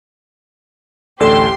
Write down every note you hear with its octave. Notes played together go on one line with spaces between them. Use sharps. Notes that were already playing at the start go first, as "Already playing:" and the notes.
A1 D2 G4 A4 D5 C6 E6